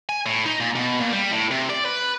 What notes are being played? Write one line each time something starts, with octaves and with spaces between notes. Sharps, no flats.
G#5
A2
D#4
A#2
B2
A#2
G3
A2
C3
D5
B4